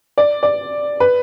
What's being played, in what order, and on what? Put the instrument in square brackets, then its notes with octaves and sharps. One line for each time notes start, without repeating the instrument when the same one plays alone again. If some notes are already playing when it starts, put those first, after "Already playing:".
[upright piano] D5
D5
B4